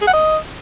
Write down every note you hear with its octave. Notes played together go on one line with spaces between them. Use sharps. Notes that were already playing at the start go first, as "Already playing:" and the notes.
G#4
F#5
D#5